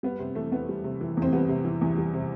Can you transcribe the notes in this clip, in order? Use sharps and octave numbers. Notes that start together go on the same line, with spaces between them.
G3 B3
C3 C4
E3 A3
E2 B3
G3
C3
E3
E2
C4
G3 B3
C3
E3
E2
G3
C3